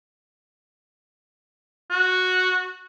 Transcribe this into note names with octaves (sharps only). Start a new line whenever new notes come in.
F#4